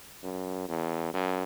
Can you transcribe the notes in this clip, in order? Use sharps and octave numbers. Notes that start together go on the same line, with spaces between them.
F#2
E2
F#2